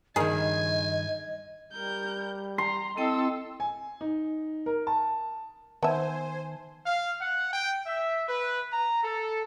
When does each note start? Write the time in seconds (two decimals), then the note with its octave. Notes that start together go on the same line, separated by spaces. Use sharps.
0.16 G2 D#3 G#4 A#4 D#5 G#5
1.73 G3 A#4 G6
2.58 A#5 C6
2.97 C4 E4 A4 D#5 G5 E6
3.60 G#5
4.01 D#4
4.66 A#4
4.87 A5
5.83 D#3 B3 C5 E5 G#5 A5
6.86 F5
7.19 F#5
7.52 G5
7.86 E5
8.27 B4
8.72 A#5
9.03 A4